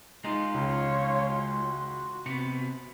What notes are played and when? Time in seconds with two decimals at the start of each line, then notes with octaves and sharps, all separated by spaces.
0.24 G#3 D#4 F4 C6
0.54 C#2 C#5 F5
1.36 F#4
2.26 C3 B3 C#7